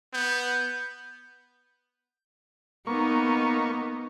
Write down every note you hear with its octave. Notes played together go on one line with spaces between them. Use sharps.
B3 G6
A#3 B3 D#4 C#6